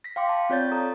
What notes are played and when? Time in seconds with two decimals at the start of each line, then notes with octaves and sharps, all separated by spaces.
0.04 A#6 B6
0.16 F5 G5 C6 D6
0.29 A5 B6
0.49 C4 F4 C#5 D5 G6 A6
0.72 A4 A#5 D#6